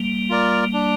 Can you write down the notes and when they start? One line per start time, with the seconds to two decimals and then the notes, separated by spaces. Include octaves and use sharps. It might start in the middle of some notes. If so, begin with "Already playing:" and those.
Already playing: G3 A#3
0.29 F4 A#4 D5
0.73 D4